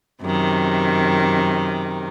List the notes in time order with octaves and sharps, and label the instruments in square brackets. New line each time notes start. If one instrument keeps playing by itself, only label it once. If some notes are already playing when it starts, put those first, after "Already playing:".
[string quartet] F#2 C3 D#3